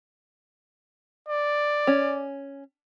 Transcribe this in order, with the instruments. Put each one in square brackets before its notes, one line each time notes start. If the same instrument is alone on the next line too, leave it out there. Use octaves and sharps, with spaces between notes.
[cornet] D5
[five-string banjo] C#4